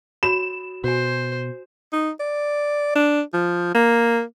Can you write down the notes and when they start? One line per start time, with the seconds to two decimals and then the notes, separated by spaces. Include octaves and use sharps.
0.23 F#4 C#5 B5 E7
0.84 B2 F#4 C5 G#5
1.93 D#4
2.20 D5
2.95 D4
3.33 F3
3.74 A#3